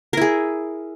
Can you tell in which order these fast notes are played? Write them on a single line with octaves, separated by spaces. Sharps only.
A#4 E4 G#4